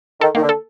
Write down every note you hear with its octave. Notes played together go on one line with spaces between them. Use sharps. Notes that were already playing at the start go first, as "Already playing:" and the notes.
D#3 A4
D#3 A#3
D3
A4